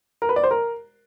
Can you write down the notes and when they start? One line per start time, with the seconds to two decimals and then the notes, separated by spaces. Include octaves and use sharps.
0.22 A#4
0.29 B4
0.36 D5
0.44 C5
0.51 A#4